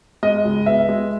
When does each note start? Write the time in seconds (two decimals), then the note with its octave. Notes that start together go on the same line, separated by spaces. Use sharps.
0.23 G#3 D#5
0.45 C#2
0.66 B3 E5
0.89 G#3